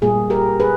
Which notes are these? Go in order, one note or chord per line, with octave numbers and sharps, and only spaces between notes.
A#2 G3 A#3 G#4
G4 A#4
G#4 B4